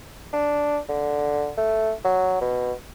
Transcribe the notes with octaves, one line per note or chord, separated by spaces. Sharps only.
D4
D3
A3
F#3
B2